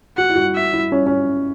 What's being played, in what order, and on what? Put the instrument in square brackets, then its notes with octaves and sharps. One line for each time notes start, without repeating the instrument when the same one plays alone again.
[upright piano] F#4 [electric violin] F#5
[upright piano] E4
F#4
[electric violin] E5
[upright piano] E4
C#4
C#4